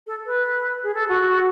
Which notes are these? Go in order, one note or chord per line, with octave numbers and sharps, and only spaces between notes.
A4
B4
G#4
A4
F#4